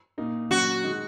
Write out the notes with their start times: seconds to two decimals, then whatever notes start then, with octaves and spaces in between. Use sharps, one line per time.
0.18 A#2 A#3 D#4
0.51 A#2 F#3 C#4 F#4
0.84 D#3 G#3 D#4